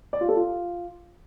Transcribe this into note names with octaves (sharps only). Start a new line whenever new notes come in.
D5
F4
A4
F4